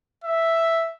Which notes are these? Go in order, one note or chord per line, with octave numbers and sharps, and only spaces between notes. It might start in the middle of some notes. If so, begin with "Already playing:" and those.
E5